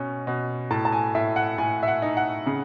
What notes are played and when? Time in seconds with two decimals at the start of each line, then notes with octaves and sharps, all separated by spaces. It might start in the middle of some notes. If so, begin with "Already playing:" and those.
Already playing: B2 C#4
0.27 B2
0.70 A2 A5
0.85 A5
0.92 G#5
1.15 A2 E5
1.36 F#5
1.58 A2 G#5
1.83 E5
1.88 F#5
2.02 D#4
2.17 F#5
2.46 C#3